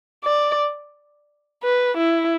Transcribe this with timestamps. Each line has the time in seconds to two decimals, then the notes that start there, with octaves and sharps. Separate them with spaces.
0.25 D5
1.63 B4
1.97 E4